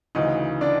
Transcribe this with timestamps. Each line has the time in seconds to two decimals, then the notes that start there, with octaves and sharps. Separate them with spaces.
0.15 D2 C#3 E3 D#4 D#5
0.61 D4 D5